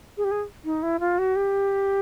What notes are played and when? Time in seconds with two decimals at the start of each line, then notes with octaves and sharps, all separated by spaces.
0.17 G#4
0.24 G4
0.31 G#4
0.65 D#4
0.83 E4
1.00 F4
1.18 F#4
1.36 G4